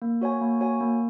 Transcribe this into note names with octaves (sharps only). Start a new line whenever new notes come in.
A#3
F#4 C#5 G#5
A#3
F#4 C#5 G#5
A#3